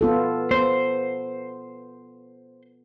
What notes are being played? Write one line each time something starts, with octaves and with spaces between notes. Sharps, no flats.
B3 F4 A4
B3 C5